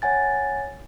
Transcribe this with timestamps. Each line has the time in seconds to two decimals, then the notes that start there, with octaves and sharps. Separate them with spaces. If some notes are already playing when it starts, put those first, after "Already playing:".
0.02 C#5 F#5 G#5 A6